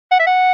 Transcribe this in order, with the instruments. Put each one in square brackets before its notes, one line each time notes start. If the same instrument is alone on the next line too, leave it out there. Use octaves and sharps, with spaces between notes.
[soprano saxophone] F#5
E5
F#5